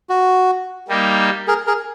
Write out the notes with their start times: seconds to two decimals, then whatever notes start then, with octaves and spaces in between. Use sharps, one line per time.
0.09 F#4
0.88 G3 A#3 D#4 G4
1.48 G#4 A#4
1.67 G#4 A#4